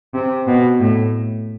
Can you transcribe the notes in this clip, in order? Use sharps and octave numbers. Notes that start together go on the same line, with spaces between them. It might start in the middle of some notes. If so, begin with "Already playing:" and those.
C3
B2
A2